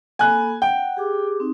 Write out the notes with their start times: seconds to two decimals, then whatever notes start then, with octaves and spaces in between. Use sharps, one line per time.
0.19 A#3 A4 G#5 B5 F#6
0.62 F#5 G5
0.97 G4 G#4 D6
1.40 C4 D#4